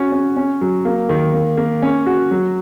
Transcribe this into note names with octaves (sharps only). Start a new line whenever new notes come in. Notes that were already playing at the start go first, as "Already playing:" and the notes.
Already playing: C#4 F#4
C#4
C#4
F#3
A#3
D#3
A#3
A#3
C#4
F#4
F#3